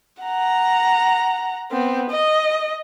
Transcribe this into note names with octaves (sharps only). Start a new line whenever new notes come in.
F#5 A#5
B3 C4
D#5